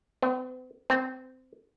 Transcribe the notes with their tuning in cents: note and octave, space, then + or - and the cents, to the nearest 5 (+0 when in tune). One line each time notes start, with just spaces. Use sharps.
C4 -45
C4 -15